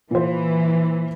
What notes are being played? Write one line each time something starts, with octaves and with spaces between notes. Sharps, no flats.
A#2 E3 C5